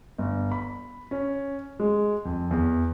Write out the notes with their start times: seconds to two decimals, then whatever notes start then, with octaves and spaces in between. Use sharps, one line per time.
0.18 G1
0.52 B5
1.11 C#4
1.80 G#3
2.25 F2
2.51 E2